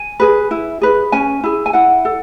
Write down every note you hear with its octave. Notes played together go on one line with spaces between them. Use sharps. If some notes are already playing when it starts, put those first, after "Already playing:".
Already playing: G#5
G#4 B4
E4
G#4 B4
C#4 G#5
E4 G#4
G#5
E4 F#5
A4